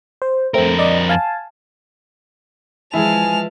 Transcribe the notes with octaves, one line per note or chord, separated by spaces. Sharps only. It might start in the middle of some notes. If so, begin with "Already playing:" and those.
C5
F2 A3 C4 A#4
D5 D#5
F5 G#5 A5
E3 F3 G#3 E4 G#4 G#5 A5 F6